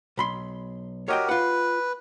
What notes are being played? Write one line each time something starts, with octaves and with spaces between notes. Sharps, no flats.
B1 B5 C6
F#4 G4 A#4 C#5 D#5 G5
F4 B4 F#5